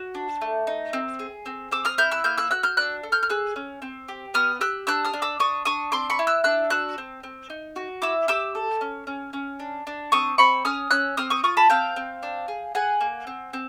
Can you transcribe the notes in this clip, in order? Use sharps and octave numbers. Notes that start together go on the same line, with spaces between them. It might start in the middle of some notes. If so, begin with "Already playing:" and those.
Already playing: F#4
D4
A3
D#4
C4
G#4
C4
C4 D6 E6
D#6 F6
E4 F6 G6
E6 F#6
A#3 F6 G6
E6 F#6
F#4 E6 F#6
F6 G6
D4 E6 F#6
A4
F6 G6
F6
G#4 E6 F#6
C#4
C4
G4
B3 D#6 F6
G4 E6 F#6
D4 E6 F#6
D#6 F6
D4
D6 E6
D4 C#6 D#6
D4 C#6 D#6
C4 C6 D6
B5 C#6
E4
E6 F#6
D4 E6 F#6
F#4 E6 F#6
C4
C4
D#4
F#4
E4 D6 E6
G4 D6 E6
A4
C#4
C#4
C#4
D4
D4
C4 C#6 D#6
C4 B5 C#6
C#4 D#6 F6
C#4 E6 F#6
C4 D#6 F6
C#6 D#6
F4 C#6 D#6
A5 B5
C4 F5 G5
C4
D4
G#4
G#4 F#5 G#5
A#3
C4
C4